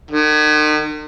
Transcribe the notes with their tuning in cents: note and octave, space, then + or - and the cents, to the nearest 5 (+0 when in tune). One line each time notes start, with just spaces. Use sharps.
D#3 -40